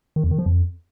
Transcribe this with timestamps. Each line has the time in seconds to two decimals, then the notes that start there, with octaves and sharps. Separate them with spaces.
0.16 D#3
0.24 E2
0.31 D#3
0.39 F3
0.46 F2